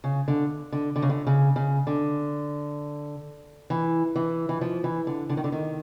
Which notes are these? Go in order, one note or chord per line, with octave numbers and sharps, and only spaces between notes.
C#3
D3
D3
D3
C#3
D3
C#3
C#3
D3
E3
E3
E3
F3
E3
D3
D3
D#3
D3
D#3